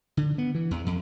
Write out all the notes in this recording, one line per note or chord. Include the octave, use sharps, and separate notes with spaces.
D3
B3
E3
E2
F2